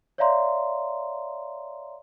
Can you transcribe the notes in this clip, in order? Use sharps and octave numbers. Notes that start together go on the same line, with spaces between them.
C#5 D5 E5 F5 A#5 C6